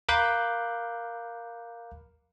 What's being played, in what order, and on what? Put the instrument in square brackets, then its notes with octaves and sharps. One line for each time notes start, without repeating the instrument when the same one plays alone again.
[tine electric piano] A#4 F5 B5 D6 F#6 G6